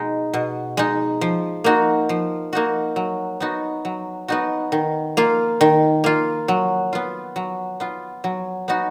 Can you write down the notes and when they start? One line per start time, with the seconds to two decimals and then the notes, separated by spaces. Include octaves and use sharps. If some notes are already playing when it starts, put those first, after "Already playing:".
Already playing: B2 G#3 D#4
0.33 B2
0.77 G#3 D#4
1.21 F3
1.64 A#3 D#4 F#4
2.09 F3
2.53 A#3 D#4 F#4
2.96 F#3
3.40 B3 D#4 F#4
3.85 F#3
4.28 B3 D#4 F#4
4.72 D#3
5.17 A#3 F4
5.61 D#3
6.04 A#3 F4
6.48 F#3
6.93 B3 F4
7.36 F#3
7.80 B3 F4
8.24 F#3
8.68 B3 D#4 F#4